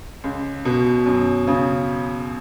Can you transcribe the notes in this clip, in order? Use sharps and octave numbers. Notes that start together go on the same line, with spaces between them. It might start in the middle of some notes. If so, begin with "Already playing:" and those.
C#2
B2
F#2
C#3